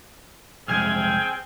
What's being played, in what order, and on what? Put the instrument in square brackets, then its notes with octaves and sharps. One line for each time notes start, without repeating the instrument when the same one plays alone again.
[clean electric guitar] C2 F2 G#3 [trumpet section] C4 G#4 G5 [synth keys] F6 G#6